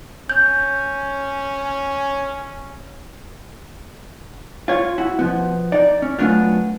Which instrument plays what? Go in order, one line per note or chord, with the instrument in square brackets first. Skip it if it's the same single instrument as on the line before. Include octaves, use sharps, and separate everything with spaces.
[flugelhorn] C#4 [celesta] G6
[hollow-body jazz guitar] F4 C#5
E4 F#4
B2 F3 B3
D#4 D5
C#4
F#2 C3 A3 B3 D4 F4